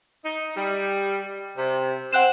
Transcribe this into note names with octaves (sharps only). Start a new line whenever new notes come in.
D#4
G3
C3
C4 F#5 F#6 E7